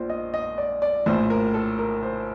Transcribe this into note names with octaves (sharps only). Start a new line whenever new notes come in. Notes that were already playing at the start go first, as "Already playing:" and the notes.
Already playing: A#1 A#2 C5 D5
D#5
D#5
D5
D5
A#1 A2 C5
A#4
A4
A#4
C5